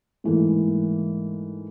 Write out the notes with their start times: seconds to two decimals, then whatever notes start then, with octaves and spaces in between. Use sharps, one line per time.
0.24 G#2 E3 A3 A#3